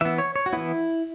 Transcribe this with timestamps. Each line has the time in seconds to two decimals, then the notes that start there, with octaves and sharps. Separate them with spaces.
0.01 E3 B3 E5
0.18 C#5
0.36 C#5
0.46 F#4
0.53 E3 B3 E4